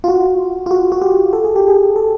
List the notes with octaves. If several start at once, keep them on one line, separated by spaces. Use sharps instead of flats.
F4
F#4
F4
F#4
F#4
G4
A4
G#4
G4
G#4
A4